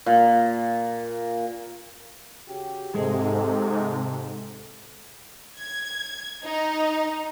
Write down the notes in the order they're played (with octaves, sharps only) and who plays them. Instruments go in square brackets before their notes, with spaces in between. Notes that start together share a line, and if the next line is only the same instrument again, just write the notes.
[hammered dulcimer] A#2
[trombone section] C#3 F#4 G4
[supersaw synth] G#2 C3 [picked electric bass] G#3 [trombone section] A4
[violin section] G#6
D#4